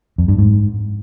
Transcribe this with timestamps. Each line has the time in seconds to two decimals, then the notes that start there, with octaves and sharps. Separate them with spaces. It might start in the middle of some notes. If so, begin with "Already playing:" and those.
0.18 F2
0.28 G2
0.38 G#2